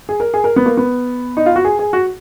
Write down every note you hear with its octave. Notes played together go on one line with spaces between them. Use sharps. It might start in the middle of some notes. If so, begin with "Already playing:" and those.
G#4
A#4
G#4
A#4
B3
A#3
B3
D#4
F4
F#4
G#4
G#4
F#4